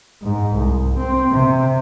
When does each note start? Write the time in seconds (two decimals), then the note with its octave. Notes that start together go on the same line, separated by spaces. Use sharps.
0.22 G#2
0.57 C2
0.98 C4
1.32 C3